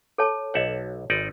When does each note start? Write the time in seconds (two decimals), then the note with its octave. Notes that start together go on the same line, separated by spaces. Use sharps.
0.18 A4 C#5 A5
0.54 B1 C#5 D#5 E5 F#5
1.10 G#1 D#4 D5